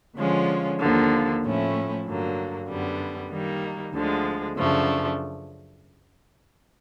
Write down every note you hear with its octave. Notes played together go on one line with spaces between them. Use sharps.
D3 F3 G#3 C#4 F4
D#2 D3 F3 A#3
A2 F3 A3 C#4 E4
G2 D3 F#3 A#3
F#2 D3 G3 B3
D#3 G3 A#3 D#4
D2 D3 F3 G#3
F#2 C#3 F3 A3 D4